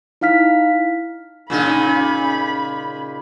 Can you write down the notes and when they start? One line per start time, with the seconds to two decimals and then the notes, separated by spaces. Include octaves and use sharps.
0.21 D#4 E4 F5 F6 B6
1.50 A#2 C#3 D#4 B5